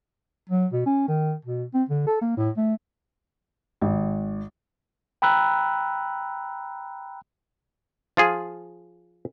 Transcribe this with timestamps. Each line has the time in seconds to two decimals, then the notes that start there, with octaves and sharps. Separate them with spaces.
0.50 F#3
0.73 B2
0.86 C#4
1.08 D#3
1.45 B2
1.74 C4
1.89 D3
2.07 A4
2.21 A#3
2.37 A2
2.57 A3
3.81 G#1
5.22 G5 A#5 B5 E6 F#6
8.17 F3 F4 G#4